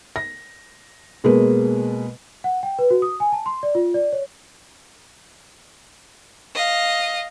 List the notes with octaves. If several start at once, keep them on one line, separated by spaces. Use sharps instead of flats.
A#6
B2 G#3 A#3 B4
F#5
G5
B4
F#4
D#6
G#5
A5
C6
D5
F4
D5
C#5
D#5 F5